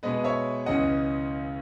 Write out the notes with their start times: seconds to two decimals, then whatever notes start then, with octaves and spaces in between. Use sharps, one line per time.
0.03 B2 G#3 B3 B4 D#5
0.24 C#5 E5
0.66 C#2 C#3 E3 D#5 F#5